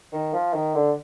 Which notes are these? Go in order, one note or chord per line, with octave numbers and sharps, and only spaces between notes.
D#3
F3
D#3
D3